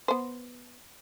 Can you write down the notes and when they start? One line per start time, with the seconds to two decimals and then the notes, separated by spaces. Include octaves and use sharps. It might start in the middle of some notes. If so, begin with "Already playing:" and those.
0.08 B3 C5